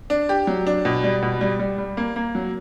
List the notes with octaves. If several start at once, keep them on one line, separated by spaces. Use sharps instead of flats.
D4
G4
F#3
D4
B2
G3
B2
G3
G3
G3
A#3
A#3
F#3